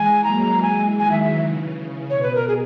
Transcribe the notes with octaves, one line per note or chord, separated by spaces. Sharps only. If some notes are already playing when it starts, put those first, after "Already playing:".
Already playing: E3 G#3 G#5
F#3 A#3 A#5
E3 G#3 G#5
D#3 F#3 G#5
E5
E5
C#3 E3
C#3
B2 C#5
B4
A#4
G#4